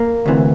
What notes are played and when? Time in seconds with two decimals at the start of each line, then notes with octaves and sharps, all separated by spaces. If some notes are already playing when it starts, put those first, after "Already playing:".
Already playing: A#3
0.26 D2 C3 E3